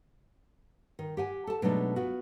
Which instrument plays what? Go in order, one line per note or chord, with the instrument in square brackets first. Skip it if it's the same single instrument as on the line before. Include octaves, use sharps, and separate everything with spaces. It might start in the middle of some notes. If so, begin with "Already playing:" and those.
[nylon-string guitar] D#3
G4 F#5 G#5
A4 A5
B2 F#3 G#3 A3 D4 D#4
B3 F4 F#4